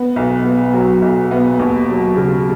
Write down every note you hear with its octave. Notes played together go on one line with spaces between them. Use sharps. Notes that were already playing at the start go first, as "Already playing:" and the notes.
Already playing: B3
B1
B3
F#3
B1
B3
D#2
F#3
C#3